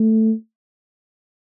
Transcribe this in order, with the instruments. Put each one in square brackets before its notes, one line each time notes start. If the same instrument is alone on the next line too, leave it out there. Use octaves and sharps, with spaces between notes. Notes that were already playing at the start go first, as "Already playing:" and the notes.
Already playing: [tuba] A3